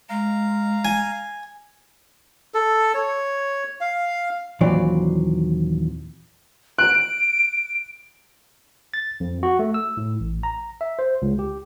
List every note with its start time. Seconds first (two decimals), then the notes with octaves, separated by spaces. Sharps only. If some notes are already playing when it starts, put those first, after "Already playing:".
0.10 G#3 F5 A#5
0.85 G#5
2.54 A4
2.94 C#5
3.81 F5
4.61 D#2 A#2 E3 F#3 C4 D5
6.79 F#6 D7
8.94 A6
9.20 F2
9.43 F#4
9.59 A3
9.74 E6
9.97 A2
10.20 A1
10.43 A#5
10.81 E5
10.99 C5
11.22 C#2
11.39 G4